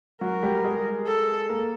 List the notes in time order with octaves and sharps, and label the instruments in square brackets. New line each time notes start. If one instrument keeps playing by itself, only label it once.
[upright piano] F#3 F#4 [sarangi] A#4
[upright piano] G3 G4
G#3 G#4
[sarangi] A4
[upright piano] A#3 A#4